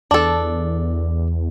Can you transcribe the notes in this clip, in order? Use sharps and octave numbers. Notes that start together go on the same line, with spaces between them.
E2 D4 A4